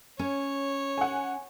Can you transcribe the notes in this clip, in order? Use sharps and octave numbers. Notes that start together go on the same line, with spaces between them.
C#4 C#5
F#5 G#5